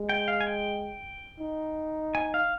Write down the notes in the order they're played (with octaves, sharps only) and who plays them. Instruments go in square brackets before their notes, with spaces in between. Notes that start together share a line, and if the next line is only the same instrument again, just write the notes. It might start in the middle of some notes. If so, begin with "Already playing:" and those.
Already playing: [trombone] G#3
[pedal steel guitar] G5
F5
G#5
G5
[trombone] D#4
[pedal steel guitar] G#5
F5